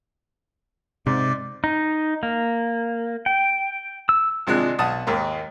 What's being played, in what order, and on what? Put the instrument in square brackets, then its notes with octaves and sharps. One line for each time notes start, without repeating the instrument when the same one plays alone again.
[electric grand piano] G#2 [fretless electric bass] C3 [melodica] D5
[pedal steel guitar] D#4
A#3
G5
E6
[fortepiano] G#1 C3 F3 G#3 D4 F#6
B1 F#5 A5 D#6
D#2 G#2 D#3 A#3